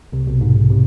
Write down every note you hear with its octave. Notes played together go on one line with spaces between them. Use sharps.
C2 C3
B1 B2
G#2
G#2
C3